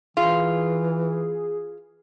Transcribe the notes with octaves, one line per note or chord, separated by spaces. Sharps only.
E3 F4 G#4